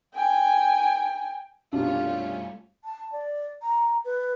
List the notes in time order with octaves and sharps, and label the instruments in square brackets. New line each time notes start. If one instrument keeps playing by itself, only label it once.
[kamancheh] G5 G#5
[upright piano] B1 F#2 C3 [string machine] G3 A3 C#4 [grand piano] D4 [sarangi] F4
[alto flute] A5
D5
A#5
B4